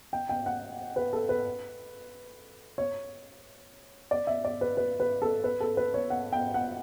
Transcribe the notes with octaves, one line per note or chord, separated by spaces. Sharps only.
G5
G5
F#5
B4
A4
B4
C#5
D5
E5
D5
B4
B4
B4
A4
B4
A4
B4
C#5
F#5
G5
F#5